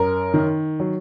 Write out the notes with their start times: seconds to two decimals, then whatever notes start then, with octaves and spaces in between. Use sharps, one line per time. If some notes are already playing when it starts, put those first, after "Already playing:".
Already playing: F#2 A#4
0.34 D#3
0.80 F#3